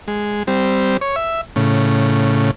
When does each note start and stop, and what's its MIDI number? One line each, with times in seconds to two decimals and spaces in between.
0.08 0.43 56
0.47 0.97 55
0.47 0.97 60
1.01 1.16 73
1.16 1.41 76
1.56 2.51 45
1.56 2.51 49